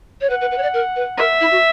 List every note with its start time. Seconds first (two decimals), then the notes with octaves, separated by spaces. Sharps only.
0.21 C#5
0.29 B4 F#5
0.41 B4
0.51 B4
0.58 C#5
0.62 D5
0.73 A#4
0.96 B4
1.18 A#4 E5
1.40 E4
1.51 F#4